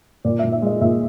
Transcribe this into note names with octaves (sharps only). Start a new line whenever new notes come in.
A#2 D5
E5
A#2
E5
G#3 D#5
A#2 E5